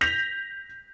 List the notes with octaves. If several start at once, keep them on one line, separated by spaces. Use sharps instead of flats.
G6 A#6 B6 F7